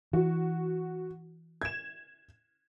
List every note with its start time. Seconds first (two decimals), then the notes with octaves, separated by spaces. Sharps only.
0.13 E3 F#4
1.62 G#6 E7